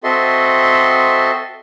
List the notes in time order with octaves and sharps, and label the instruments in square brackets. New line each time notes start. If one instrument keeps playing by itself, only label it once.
[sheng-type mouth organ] C4 F#4 A4 D#5 E5 C6